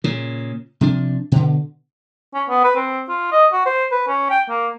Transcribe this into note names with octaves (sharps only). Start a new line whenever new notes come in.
A#2 C#3
C3 F3 D4
B2 D3
C#4
B3
B4
C4
F4
D#5
F#4
C5
B4
C#4
G5
A#3